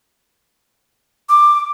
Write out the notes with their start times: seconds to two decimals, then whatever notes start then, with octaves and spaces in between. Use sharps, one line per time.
1.29 D6